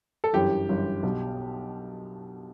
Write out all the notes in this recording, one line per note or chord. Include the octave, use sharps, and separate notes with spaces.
A4
G1 F#2 E3 G4
G1 F#2 E3
B1 B2